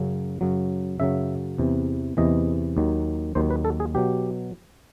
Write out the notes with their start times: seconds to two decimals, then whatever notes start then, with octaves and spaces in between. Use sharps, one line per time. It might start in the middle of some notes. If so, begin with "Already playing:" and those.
Already playing: F#2 C#3 F#3
0.41 F#2 C#3 F#3
1.00 F#2 C#3 F#3 E5
1.58 E2 C3 E3
2.17 E2 C3 E3 D#5
2.77 D#2 D#3 F#3
3.35 D#2 D#3 F#3 C5
3.50 B4
3.65 A4
3.80 G#4
3.95 B2 F#3 G4